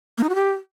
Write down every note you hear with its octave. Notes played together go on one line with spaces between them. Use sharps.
A#3
D#4
F#4
G4